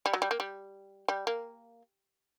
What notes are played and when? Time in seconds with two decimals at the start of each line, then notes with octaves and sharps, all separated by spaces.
0.06 G3
0.14 F#3
0.22 G3
0.31 A#3
0.40 G3
1.08 G3
1.27 A#3